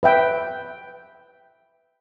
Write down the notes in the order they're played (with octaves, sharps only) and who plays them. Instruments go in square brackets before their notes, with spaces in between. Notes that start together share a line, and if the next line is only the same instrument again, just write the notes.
[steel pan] B4 E5 G5